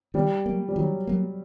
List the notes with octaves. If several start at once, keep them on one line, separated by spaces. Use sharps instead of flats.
D#3 G3
F#3 A#3
G3
D#3 F#3
F#3 A#3